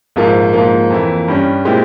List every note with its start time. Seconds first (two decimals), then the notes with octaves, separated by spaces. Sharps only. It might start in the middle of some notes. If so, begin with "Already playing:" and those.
0.16 A#1 G#2 F3 A#3
0.53 G#2 F3 A#3
0.90 F2 E3 A#3 E4
1.28 G2 G3 C#4
1.65 A#2 G#3 C4 E4 G4